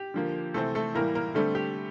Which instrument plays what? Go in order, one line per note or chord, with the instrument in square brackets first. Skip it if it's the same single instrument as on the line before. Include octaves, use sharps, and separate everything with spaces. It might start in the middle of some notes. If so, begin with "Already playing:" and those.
Already playing: [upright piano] G4
D3 F3 A#3
C3 E3 A3 C4 A4
A3 A4
A2 E3 G3 A#3 A#4
A#3 A#4
D3 G3 A3 C4 A4
G4